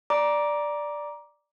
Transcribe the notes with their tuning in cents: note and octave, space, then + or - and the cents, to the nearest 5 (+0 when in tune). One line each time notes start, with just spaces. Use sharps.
D5 +0 A#5 +20 D6 +0